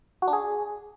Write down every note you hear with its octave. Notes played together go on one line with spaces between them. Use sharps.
F#4
D4
G#4